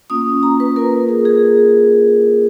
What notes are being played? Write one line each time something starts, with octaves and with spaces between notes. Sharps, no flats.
A#3 C#4 F4 D#6
A#5
B4
A#3 F4 A#4
G#4
G#4